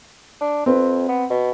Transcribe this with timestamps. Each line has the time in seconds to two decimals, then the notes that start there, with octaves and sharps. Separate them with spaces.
0.41 D4
0.66 F2 C4 B4
1.09 B3
1.30 B2